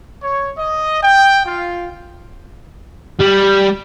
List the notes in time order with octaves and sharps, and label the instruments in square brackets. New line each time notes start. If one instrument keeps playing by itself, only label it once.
[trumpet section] C#5
D#5
G5
F4
[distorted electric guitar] G3